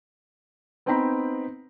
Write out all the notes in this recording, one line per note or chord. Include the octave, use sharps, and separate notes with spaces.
B3 C4 D#4 G5 A#5 B5